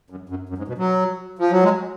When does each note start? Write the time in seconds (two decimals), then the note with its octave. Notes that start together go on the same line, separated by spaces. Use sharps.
0.10 F#2
0.29 F#2
0.49 F#2
0.58 G#2
0.68 B2
0.78 F#3
1.39 F3
1.51 F#3
1.63 G#3